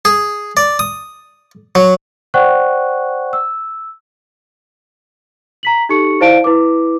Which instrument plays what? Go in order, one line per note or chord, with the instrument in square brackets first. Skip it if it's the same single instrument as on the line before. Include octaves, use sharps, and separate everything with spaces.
[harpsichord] G#4
D5
D#6
F#3
[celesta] C5 D5 F#5 G5 C#6 F#6
E6
A#5 B6 F#7
D#4 G4 A4 C#6 C#7
E4 C5 D5 F5 A5 D7
E4 B4 D6